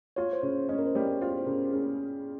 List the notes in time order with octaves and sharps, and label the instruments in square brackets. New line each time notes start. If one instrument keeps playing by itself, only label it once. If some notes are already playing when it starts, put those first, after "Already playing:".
[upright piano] F4 [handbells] C#5
[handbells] C5
[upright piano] C#3 [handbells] C#5
[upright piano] C#4 [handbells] D#5
[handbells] A#4
C5
[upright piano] G3 [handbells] C#5
[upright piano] F4 [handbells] C5
[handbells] C5
[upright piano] C#3 [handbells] A#4
[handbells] G4
[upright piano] C#4 [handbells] G#4